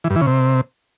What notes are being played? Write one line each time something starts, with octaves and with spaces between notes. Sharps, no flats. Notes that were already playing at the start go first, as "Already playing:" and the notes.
E3
G2
E3
C#3
C3